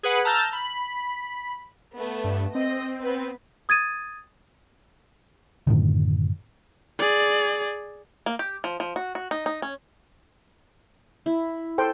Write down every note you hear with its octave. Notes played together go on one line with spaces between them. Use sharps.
G#4 B4 F#5 B5
A5 A#5 E6 F6 G6 A6
B5
A3 B3
G2
C4 D#5
B3 B4
D#6 G#6 A6 D#7
F#2 A2 D3 D#3
G#4 D5
A#3
G4
F3
F3
F#4
F#4
D#4
D#4
C#4
E4
A4 C5 G5